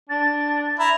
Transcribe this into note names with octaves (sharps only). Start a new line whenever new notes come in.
D4 A6
E4 A#5